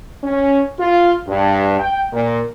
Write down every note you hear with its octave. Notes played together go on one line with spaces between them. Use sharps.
C#4
F4
G2
G5
A#2